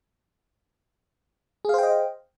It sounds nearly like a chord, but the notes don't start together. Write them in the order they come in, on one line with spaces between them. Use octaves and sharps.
G#4 F5 C5 G5 D#5